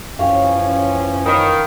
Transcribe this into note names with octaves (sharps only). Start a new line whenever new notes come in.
F#2 E3 F3 C#4 G4 C#5 F5
D#3 B5